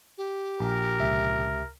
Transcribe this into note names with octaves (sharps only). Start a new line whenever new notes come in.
G4
A#1 A#4
C#2 C3 E5